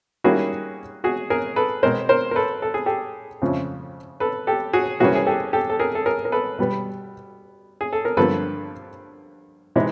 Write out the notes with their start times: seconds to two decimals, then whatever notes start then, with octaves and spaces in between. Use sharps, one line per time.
0.24 D#3 G3 A#3 C#4 E4 F#4 G#4
1.04 F#4 G#4
1.30 G#4 A#4
1.56 A4 B4
1.83 B2 G#3 C4 A#4 C5
2.09 A#4 C5
2.31 A#4
2.36 A4 B4
2.62 A4
2.74 G#4
2.86 G4 A4
3.42 F2 C#3 F3 A3 C#4
4.20 A4 B4
4.47 G4 A4
4.73 F#4 G#4
5.00 C3 E3 G3 A#3 C#4 F#4 G#4
5.15 G#4
5.27 G4 A4
5.53 G4 A4
5.70 A4
5.80 G#4 A#4
5.95 A4
6.06 G#4 A#4
6.25 A#4
6.32 A4 B4
6.59 B2 G3 B3
7.81 G#4
7.93 A4
8.05 A#4
8.17 G2 D3 F3 A#3 A4 B4
9.76 C3 E3 G#3 B3 D#4